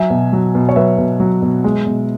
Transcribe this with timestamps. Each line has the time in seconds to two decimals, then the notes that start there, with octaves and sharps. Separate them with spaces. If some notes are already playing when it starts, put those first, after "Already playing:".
Already playing: F#3 E5 G#5
0.10 B2
0.33 F#3
0.55 B2
0.69 C#5
0.76 F#3 B4 E5
0.98 B2
1.20 F#3
1.42 B2
1.64 G#3
1.86 B2